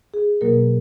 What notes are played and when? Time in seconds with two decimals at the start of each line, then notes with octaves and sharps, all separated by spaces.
0.14 G#4
0.41 B2 F#3 A#3 A#4